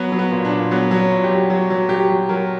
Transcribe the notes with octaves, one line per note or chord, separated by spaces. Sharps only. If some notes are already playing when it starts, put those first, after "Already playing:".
Already playing: F#3 B3
F#3
B3
A#2
D4
A#2
F#3 B3
F#3
C#4
A#2
G4
F#3
F#3
F#3
F#3 G4
F#3
F#3 A#4